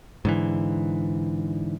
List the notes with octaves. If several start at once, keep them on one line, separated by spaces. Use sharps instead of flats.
G#2 D3 E3